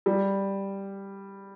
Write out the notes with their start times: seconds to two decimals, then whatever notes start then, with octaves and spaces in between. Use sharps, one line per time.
0.06 G3